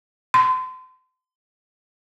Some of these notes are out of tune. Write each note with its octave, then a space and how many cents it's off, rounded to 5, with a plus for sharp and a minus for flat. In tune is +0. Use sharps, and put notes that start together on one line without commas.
C6 -35